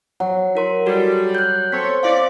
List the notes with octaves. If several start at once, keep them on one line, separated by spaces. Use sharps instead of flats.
F#3 F#5
E4 A#4 C6
G3 F#4 A4
F#6 G6
C4 A4 C#5 B6
E4 D5 F5